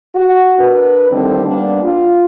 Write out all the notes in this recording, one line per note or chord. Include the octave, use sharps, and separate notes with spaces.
F#4
D4 A#4 B4
A2 D3 D#3 G3 C4
G3 A#3 B3 D4
F4